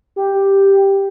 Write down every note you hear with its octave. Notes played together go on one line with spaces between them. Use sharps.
G4